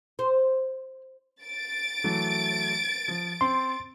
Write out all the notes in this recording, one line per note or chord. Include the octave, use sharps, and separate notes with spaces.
C5
A6 D7
E3 F#3 A3
F3
C4 C6